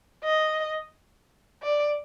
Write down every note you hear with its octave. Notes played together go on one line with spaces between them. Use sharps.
D#5
D5